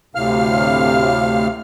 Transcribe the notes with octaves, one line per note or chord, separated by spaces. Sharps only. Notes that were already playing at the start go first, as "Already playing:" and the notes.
D2 A2 C3 F5 F6